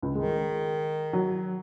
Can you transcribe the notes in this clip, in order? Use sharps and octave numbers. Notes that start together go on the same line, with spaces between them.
C#2
D#3 G#3
F#3